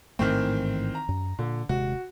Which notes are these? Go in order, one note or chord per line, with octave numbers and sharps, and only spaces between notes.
A1 G#2 D#3 E3 A3 C4
A#5
F#2
A#2 D3
D#1 C3 G#3 F#4